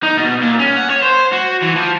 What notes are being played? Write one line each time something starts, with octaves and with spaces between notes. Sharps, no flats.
D#4
B2
A#2
C#4
F#5
C#5
C5
F#4
E3
F3